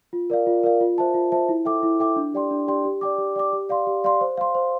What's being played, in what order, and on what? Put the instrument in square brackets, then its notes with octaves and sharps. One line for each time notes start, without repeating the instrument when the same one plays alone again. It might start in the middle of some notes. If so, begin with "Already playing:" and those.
[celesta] F4
A#4 D5 F5
F4
A#4 D5 F5
F4
C5 E5 A5
F4
C5 E5 A5
E4
A4 E5 G5 D6
E4
A4 E5 G5 D6
D4
G4 D5 G5 C6
D4
G4 D5 G5 C6
G4
D5 G5 D6
G4
D5 G5 D6
G4
D5 F5 C6
G4
D5 F5 C6
C5
F5 C6
C5